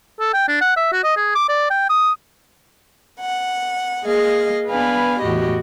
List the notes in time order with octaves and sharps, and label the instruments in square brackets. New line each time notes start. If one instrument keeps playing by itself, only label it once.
[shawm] A4
G5
D4
F#5
E5
F#4
D#5
G#4
D6
D5
G5
D#6
[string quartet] F#5
A#3 G#4 D#5 F5
B3 D4 B4 F5 G#5 B5
E2 A2 F#4 G4 D#5